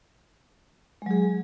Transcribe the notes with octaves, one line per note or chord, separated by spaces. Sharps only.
F#3 G#3 G#4